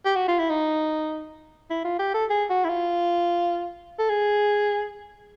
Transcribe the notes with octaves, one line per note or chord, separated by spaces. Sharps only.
G4
F#4
F4
E4
D#4
E4
F4
G4
A4
G#4
F#4
E4
F4
A4
G#4